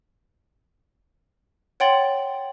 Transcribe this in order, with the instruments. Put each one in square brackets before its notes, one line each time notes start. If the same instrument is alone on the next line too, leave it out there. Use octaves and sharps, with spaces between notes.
[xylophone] C#5 F#5 G5 C6 A6 F#7